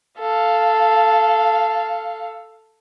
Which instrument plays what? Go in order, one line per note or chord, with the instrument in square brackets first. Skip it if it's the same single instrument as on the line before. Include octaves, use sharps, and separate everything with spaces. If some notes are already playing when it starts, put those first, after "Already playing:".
[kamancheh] A4 F5